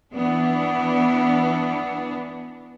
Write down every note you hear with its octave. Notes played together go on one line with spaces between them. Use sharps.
E3 B3 D4